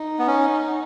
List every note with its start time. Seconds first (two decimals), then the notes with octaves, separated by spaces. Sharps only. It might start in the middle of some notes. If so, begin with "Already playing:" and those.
Already playing: D#4
0.19 B3
0.27 C#4